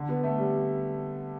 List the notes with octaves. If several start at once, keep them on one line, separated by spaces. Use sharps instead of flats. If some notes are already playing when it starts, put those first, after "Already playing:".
Already playing: D3
B3
A3
G3